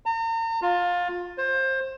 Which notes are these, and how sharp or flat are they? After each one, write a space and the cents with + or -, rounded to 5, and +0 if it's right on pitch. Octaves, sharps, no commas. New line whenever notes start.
A#5 -40
F4 +20
C5 +20